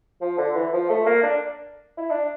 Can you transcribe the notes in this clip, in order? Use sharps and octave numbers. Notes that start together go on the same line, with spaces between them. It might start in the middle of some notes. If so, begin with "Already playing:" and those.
F3
D3
E3
F3
A3
A#3
D4
E4
D4